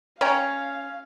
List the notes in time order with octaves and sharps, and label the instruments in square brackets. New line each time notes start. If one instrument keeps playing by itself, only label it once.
[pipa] C#4 [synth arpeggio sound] C#5 G5 A#5 [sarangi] F5